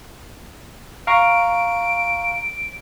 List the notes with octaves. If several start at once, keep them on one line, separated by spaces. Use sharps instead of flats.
F5 A#5 C#6 D7